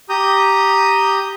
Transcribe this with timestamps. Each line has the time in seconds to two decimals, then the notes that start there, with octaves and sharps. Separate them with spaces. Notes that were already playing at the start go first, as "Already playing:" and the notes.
0.09 G4 A#5 D#6 G6